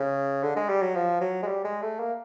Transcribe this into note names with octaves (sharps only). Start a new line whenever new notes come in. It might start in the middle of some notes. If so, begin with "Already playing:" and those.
Already playing: C#3
D3
G#3
G3
F#3
F3
F#3
G#3
G3
G#3
A3
A#3